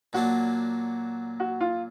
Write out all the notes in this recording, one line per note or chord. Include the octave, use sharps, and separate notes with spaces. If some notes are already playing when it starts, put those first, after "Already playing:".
A#2 F#3 A#3 D4 F#4
F#4
F4